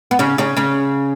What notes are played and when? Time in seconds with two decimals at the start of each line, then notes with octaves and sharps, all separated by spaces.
0.11 B3
0.19 C#3 C#4
0.38 C#3 C#4
0.57 C#3 C#4